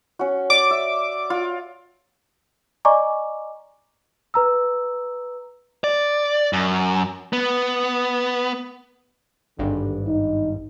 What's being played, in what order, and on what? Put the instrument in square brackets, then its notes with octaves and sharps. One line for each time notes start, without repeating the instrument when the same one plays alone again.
[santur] C#4 F#4
[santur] D5 [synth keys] D6
[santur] E5
F4
[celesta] D5 D#5 G#5 A#5 C#6 D6
B4 A#5 E6
[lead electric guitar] D5
F#2
B3
[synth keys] G#1 G2 [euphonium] D3
[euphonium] D#4